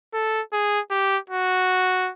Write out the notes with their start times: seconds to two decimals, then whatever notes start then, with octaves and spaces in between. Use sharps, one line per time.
0.14 A4
0.53 G#4
0.91 G4
1.30 F#4